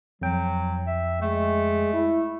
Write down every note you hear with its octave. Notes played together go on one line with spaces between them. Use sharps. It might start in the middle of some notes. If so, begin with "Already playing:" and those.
F2 F#3 G5
E5
G#3 A3
E4